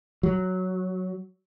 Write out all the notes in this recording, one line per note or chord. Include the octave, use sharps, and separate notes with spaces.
F#3